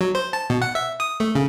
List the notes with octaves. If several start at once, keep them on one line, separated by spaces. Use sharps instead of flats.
F#3
C5
A5
B2
F#5
E5
D#6
A3
C#3